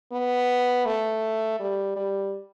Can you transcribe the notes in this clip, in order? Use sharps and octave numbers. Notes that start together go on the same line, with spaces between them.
B3
A3
G3
G3